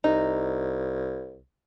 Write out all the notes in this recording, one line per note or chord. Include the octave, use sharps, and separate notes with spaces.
C2 D#4